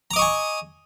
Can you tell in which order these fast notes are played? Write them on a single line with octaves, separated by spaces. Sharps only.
A#5 D6 D#5 C#6 G#5